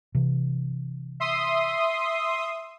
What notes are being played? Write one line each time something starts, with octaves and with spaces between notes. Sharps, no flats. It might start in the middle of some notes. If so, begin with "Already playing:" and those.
C3 E3
E5 C6 D#6